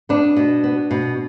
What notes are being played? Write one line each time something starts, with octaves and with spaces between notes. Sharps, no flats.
B3 D4
B2
B3
B2